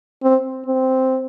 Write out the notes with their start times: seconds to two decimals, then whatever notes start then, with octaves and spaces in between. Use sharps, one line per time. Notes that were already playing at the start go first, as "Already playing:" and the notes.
0.23 C4
0.66 C4